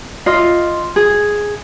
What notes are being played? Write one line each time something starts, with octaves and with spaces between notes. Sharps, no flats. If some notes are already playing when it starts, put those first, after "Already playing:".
F4 D#5
G#4